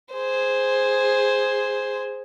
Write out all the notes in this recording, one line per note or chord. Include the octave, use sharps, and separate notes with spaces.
G#4 C5